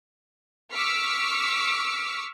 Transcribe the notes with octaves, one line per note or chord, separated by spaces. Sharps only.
C#6 D6 E6 F6 B6 C#7